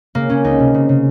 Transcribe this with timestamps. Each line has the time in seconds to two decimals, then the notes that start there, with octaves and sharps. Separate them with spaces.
0.15 C#3 A#3
0.30 C#3 C#4
0.44 C#2 D#4
0.59 C3
0.74 C#3
0.89 C#3